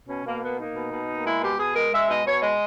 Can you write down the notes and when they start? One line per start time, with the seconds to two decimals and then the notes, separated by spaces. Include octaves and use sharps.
0.08 B2 C#4
0.25 B2 A#3
0.41 A#3 B3
0.58 A#3 D#4
0.75 B2
0.92 B2
1.08 A#3
1.25 G#3 E4
1.41 B2 G4
1.58 B2 G#4
1.75 G#3 A#4
1.92 G#3 E5
2.08 B2 D#5
2.25 B2 C#5
2.41 G#3 D#5